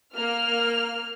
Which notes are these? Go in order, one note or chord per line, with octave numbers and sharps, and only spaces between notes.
A#3 F6